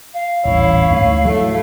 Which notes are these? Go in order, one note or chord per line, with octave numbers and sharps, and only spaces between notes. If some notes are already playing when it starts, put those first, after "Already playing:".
F5
D#1 A1 E4 C#5
D2 G#2 A3
F#3 A3 E4